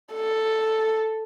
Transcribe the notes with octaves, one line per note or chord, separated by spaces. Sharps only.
A4